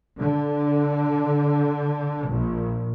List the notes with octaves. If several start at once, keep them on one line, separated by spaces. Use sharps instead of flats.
D3
A#1